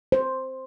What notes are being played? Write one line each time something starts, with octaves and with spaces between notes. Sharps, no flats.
C5